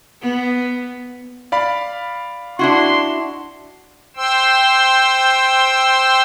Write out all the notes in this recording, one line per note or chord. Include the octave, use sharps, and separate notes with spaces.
B3
D5 F5 B5
D4 E4 F#4 C6
C5 G5 C6 E6